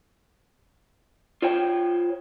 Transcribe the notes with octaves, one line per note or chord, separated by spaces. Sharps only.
F4 C5 C#5 G5